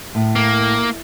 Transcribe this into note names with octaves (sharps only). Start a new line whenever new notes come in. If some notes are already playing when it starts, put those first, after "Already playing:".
A2
A#3